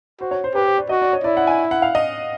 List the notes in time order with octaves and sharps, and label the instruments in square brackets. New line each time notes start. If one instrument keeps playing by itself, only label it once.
[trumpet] F#4 [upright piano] C5
[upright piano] C#5
C5
[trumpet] G4 [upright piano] B4
[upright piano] C5
D5
[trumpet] F#4 [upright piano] D#5
[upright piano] D5
C#5
[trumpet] E4 [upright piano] D5
[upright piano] F#5
G#5
F#5
F5
D#5